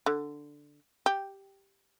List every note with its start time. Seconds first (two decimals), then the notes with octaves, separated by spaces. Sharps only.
0.06 D3
1.06 G4